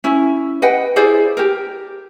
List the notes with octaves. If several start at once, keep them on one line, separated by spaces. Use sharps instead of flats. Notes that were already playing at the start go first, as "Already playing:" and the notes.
C#4 E4
B4 D#5 F#5 G5
E4 G#4 C5 D5
G4 A#4